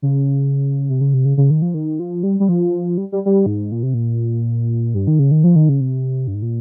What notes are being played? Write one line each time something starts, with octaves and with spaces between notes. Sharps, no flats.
C#3
C3
C#3
C3
C#3
C#3
D#3
F3
D#3
F3
G3
G3
F3
G3
G3
G3
G#2
A#2
C3
A#2
G2
D#3
C#3
D#3
F3
D#3
C#3
C3
G2
G#2
A#2